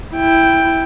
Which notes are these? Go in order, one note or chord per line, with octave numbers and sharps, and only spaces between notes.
E4 G5